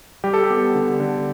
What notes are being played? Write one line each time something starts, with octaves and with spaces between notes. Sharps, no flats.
G3 G4
A4
G4
B3
D3
D3